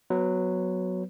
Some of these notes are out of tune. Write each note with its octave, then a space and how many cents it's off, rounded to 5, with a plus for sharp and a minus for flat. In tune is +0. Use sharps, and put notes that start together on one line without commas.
F#3 +0 B3 +0 B4 +20